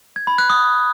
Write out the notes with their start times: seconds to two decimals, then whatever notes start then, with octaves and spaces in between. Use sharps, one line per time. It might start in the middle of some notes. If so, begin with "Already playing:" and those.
0.16 G#6
0.27 B5
0.38 F#6
0.50 D#6